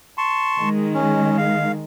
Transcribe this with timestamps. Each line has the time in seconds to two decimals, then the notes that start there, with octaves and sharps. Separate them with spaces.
0.18 A5 C6 C#6
0.57 D#3 G#3
0.94 C#4
1.37 F5